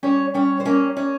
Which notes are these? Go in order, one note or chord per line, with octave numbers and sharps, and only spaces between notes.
G3 C#4 C#5
G3 C#4 C#5
C5
A#3 C#4 C#5
C#4 C#5